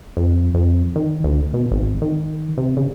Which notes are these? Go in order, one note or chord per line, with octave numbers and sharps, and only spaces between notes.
F2
F2
D#3
D2
B2
G#1
D#3
C3
C#3